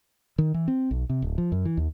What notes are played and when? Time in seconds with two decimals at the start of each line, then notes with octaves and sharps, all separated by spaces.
0.38 D#3
0.54 E3
0.68 C4
0.91 B1
1.10 C3
1.22 D1
1.38 F3
1.52 F#2
1.65 E3
1.77 D#2